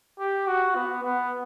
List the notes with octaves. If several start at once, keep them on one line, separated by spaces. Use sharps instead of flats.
G4
F#4
B3
B3